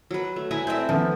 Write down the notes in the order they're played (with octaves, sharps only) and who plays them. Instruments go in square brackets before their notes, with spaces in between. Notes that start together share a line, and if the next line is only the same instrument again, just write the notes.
[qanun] F#3 B4
A3
[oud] E4 [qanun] B4 G#5 A#5
[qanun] A3 [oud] C4 E4 E5
[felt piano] D#3 B3 [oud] F3